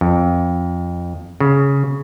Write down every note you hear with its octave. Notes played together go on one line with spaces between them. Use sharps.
F2
C#3